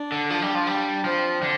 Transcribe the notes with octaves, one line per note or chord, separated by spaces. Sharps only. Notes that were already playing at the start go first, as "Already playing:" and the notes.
Already playing: D4
D3
F3
G3
F3
G3
F3 C4
D3